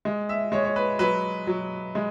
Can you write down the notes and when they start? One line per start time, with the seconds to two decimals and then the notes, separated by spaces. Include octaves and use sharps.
0.05 G#3
0.29 E5
0.52 G#3 C#5
0.65 C#5
0.76 B4
0.99 F#3 B4
1.47 F#3
1.95 G#3